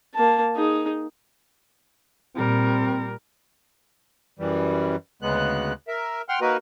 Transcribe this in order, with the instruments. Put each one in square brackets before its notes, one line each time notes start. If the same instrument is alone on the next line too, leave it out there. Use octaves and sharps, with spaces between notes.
[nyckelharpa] A#3 A5
D#4 G#4
[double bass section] A#2 [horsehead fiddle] G3 A#4 [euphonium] C4
[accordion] F#2 E3 G3
D2 C#3 G#3 B3 F#6
A#4 E5
F#5 G5 C6 F6
A#3 D#4 F#4 A#4 B4